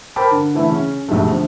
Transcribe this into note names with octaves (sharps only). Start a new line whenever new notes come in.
A#4 C5 G5 A5 B5 D6
D3
D3 E3 A3 E4
C#3 C#4
A#1 D#2 B2 G#3 A3
D3 F3